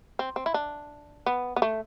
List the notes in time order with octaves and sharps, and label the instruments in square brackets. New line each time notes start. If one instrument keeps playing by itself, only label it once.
[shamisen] C4
C4
E4
D4
B3
B3
A3